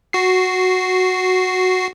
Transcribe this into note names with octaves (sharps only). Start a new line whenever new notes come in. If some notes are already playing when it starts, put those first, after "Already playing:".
F#4 C7